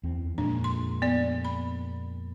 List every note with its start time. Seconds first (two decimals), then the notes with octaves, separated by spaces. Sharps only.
0.03 E2 C4
0.38 F2 A#2 G#3 D4
0.64 C6
1.02 B3 D5
1.45 B5